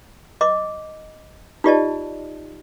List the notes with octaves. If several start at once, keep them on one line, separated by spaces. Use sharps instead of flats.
D#5 D6
D#4 F4 G4 D5 D#5 A5